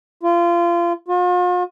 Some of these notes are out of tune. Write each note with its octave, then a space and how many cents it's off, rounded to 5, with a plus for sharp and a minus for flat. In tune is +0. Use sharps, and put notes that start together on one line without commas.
F4 -25
F4 +45